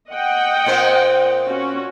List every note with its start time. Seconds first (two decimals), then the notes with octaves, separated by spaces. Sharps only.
0.10 D#5 F#5 G5
0.66 A#2 C4 C5
1.47 C#4 F#4